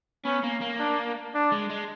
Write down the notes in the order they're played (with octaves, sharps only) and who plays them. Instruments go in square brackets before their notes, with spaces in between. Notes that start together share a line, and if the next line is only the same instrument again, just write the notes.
[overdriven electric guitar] B3 [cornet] C#4
[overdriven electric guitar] A#3
A#3
[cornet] D4
D4
[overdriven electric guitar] G#3
G#3